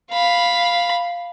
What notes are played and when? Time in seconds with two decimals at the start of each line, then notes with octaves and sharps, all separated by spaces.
0.11 F5 B5